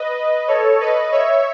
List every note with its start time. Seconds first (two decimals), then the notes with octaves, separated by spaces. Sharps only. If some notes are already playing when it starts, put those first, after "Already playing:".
Already playing: B4 D#5
0.48 A4 C#5
0.80 B4 D#5
1.12 C#5 E5